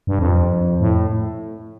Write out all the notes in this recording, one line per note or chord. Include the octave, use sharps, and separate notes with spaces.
G2
F2
A2